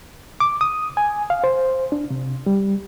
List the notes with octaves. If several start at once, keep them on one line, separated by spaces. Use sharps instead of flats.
D6
D#6
G#5
F5
C5
D4
C3
G3